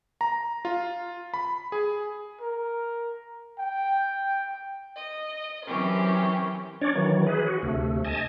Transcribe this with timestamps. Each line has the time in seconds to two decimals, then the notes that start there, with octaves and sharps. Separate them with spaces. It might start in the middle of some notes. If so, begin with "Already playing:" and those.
0.21 A#5
0.65 F4
1.34 B5
1.72 G#4
2.41 A#4
3.59 G5
4.96 D#5
5.66 E3 F#3 C4 C#4 G4 A#4
6.81 C#4 D4 C#5 D5
6.95 D#3 E3 F#3
7.27 G#4 B4
7.47 F#4
7.63 D2 C3 A3
8.05 D#5 G#5 A5